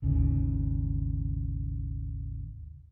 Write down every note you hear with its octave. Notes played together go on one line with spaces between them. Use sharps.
G#1 D#2 C#3